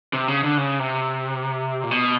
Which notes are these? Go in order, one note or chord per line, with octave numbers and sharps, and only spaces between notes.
C3
C#3
D3
C#3
C3
A#2
B2